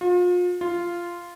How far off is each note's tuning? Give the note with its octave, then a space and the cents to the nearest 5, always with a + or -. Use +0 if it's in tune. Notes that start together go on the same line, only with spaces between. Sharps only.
F4 +35
F4 -10